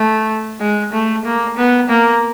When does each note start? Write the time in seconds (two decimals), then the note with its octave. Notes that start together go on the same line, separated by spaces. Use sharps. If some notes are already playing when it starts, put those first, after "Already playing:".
Already playing: A3
0.61 G#3
0.93 A3
1.25 A#3
1.57 B3
1.89 A#3